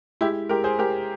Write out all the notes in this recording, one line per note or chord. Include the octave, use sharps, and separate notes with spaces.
G#3 E4 G4
G#3 G4 A#4
G#4 C5
G#3 G4 A#4